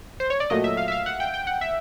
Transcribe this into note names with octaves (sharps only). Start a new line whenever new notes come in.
C5
C#5
D5
A#2 F#3 A3 D#5
E5
F5
E5
F5
F#5
G5
G5
F#5
E5